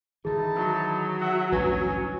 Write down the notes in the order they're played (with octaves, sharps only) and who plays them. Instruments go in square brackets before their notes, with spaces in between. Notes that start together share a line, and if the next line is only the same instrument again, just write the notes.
[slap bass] D#3 E3 [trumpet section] D#4 E4 A5 [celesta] G#4
[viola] F#3
[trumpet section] E5 F#5
[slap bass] A1 D2 G2 [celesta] B4 [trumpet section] C#5 G#5